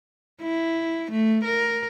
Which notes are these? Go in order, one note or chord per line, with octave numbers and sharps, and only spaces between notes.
E4
A3
A#4